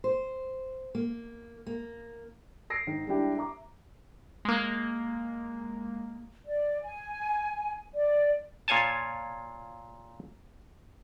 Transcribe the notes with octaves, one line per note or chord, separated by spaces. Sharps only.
C5
A#3
A#3
E6 A#6 C7 D7
G#2 D#3
G3 G#3 D4 E4 G4
E5 A#5 D6
G#3 A#3
D5
G#5
D5
A#2 F4 C#5 G#5 A5